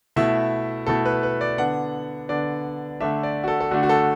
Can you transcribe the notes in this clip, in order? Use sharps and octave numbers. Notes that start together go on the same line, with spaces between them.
B2 A3 E4 E5
B2 A3 E4 A4
B4
B4
D5
D3 B3 D4 F#5
D3 B3 D4 D5
D3 A3 D4 E5
D5
F#4
A4
A4
D3 A3 D4 F#4
F#4
A4